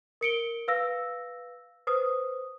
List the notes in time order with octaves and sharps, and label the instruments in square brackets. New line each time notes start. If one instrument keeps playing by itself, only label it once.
[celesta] A#4 C#7 D7 G7
B4 F5 E6 A#6
B4 C5 D#6